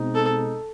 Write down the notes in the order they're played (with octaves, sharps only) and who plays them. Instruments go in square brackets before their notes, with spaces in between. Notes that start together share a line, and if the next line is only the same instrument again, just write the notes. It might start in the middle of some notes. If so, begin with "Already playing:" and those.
Already playing: [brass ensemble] B2 G#3 C4 D#4
[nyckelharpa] A4